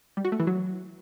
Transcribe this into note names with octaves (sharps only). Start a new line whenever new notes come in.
G3
F#4
A3
E3
F#3